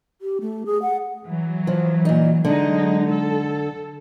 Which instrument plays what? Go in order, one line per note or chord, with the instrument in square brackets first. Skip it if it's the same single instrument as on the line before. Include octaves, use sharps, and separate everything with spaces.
[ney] G4
A3
G#4
F#5
[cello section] E3 F#3
[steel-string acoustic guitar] F3
A#2 D#4
[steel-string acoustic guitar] D3 [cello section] F#3 G#3 D#4
[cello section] A4